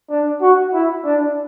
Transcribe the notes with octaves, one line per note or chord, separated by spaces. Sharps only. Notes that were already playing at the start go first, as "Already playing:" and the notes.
D4
F#4
E4
D4